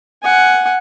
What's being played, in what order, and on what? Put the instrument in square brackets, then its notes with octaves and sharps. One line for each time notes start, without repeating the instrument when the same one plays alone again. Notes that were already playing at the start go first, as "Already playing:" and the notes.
[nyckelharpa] F#5 G#5